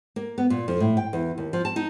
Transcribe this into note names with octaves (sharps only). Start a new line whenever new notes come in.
A#3
B3
A#2
F2
A2
G5
E2
D#2
F3
A5
D#4